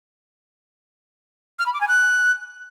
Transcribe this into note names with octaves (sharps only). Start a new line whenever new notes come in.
F6
B5
D6
G#5
F#6